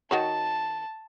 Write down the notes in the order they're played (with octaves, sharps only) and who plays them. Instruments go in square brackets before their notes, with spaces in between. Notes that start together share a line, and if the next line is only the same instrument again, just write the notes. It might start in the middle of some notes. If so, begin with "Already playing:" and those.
[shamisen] D#3 F#4 C#5 [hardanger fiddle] A5